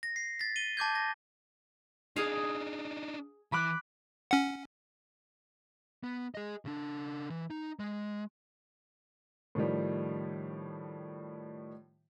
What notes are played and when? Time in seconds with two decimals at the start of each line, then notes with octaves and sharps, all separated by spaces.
0.03 A#6
0.16 C7
0.39 A6 B6
0.56 D#7 G7
0.77 A5 D6 G6 G#6
0.95 A#6
2.16 D4 D#4 G#4 F5
3.52 E3 B5 D6 F#6
4.31 C#4 F#5
6.04 B3
6.35 G#4 D#5
6.65 C#3 D4
7.30 E3
7.50 D#4
7.79 G#3
9.55 A2 D#3 F3 G3